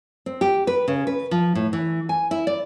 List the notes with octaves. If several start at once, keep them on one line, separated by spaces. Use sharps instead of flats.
C4
G4
B4
C#3
B4
F3
A2
E3
G#5
E4
D5